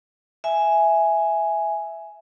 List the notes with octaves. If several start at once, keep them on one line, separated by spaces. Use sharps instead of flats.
E5 G#5